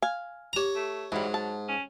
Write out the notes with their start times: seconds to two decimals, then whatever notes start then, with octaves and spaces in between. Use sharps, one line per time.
0.02 F5 G#5
0.53 G4 C#5 A#5 F7
0.75 A3
1.12 G#2 E3 F#3 G3
1.34 A5
1.68 C#4